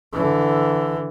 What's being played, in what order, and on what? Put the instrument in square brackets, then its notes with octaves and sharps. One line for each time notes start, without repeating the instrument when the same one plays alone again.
[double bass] D3 E3